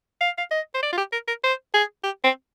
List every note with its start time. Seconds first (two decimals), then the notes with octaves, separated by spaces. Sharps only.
0.21 F5
0.38 F5
0.51 D#5
0.74 C5
0.83 D5
0.93 F4
0.98 G4
1.12 A#4
1.28 A#4
1.44 C5
1.74 G#4
2.04 G4
2.24 C4